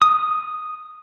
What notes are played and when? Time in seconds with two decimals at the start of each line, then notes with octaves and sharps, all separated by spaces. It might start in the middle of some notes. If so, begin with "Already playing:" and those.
0.02 D#6